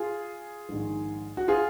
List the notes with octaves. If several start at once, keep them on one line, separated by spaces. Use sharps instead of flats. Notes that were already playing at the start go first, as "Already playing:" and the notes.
Already playing: F4 G#4
A#1 G#2 D#3
F#4
F4 G#4